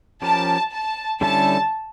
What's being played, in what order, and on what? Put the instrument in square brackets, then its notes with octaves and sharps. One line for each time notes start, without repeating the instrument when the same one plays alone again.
[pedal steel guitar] F3 C#4 G4 A#4 [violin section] A5
[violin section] A5
[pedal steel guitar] D3 G3 C#4 E4 A4 [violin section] A5